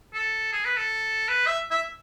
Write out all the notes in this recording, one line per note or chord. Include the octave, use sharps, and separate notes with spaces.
A4
G#4
B4
A4
B4
E5
E5